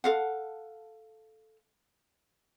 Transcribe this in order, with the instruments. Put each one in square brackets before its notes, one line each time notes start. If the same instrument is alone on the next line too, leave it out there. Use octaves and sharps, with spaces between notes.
[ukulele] A4 F5 F#5